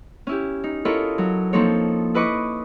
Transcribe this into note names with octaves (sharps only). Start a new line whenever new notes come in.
C#4 E4 G4
D#4
E4 F4 A4 A#4 C#5 D#5
F#3
F3 A#3 C4 D#4 A4 C#5
E4 B4 D#5 C#6 D6